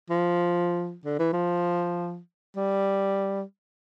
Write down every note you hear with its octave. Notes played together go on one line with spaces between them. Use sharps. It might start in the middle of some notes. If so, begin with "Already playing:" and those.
F3
D3
E3
F3
G3